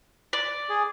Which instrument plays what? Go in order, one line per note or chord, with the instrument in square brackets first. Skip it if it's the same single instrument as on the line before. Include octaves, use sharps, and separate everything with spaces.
[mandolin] D5
[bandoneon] G#4